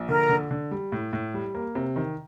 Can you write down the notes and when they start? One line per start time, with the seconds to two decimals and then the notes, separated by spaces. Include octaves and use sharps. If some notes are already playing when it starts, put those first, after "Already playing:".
Already playing: A#1
0.09 D3 A#4
0.29 D3
0.51 D3
0.71 G3
0.92 A2
1.13 A2
1.34 G3
1.55 A#3
1.75 C3
1.96 D#3